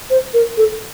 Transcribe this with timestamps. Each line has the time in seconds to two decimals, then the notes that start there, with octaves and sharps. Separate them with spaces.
0.10 C5
0.34 A#4
0.57 A4